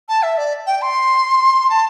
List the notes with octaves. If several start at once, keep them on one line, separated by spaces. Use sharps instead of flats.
A5
E5
D5
G5
C6
A5